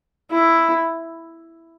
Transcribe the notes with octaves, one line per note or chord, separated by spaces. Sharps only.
E4